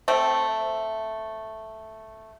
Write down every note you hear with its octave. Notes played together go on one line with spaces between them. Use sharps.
A3 C4